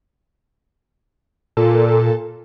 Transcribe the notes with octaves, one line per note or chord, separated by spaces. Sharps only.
A#2 A4